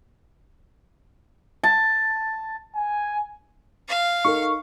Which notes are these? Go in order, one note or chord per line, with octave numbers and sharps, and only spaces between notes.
A5
G#5
F5
D#4 A4 A#4 C#6